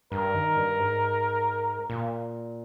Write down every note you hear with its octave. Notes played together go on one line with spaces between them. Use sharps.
G2 A#4
D#3
G2
G#2
A#2